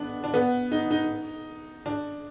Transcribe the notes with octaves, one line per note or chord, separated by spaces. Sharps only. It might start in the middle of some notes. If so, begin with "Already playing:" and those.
Already playing: B3 D4
D4
B3
D#4
D#4
D4